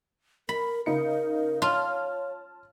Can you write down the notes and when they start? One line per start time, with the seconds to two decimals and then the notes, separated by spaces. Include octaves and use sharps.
0.49 A#4 B5
0.86 C#3 D#4 A#4 C#7
1.62 F4 C#5 A5 F6